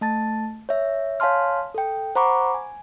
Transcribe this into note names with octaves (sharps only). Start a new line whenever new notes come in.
A3 A5 A6
C#5 E5
C#5 F5 G#5 A5 C6 F6
A4 G5
C5 F#5 A#5 B5 C#6 D6
G#5